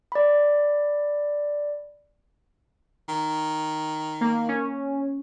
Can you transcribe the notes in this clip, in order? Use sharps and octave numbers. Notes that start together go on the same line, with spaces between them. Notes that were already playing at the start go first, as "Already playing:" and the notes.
D5 B5
D#3
A#3
C#4